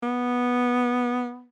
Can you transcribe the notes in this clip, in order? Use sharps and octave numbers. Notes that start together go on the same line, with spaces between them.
B3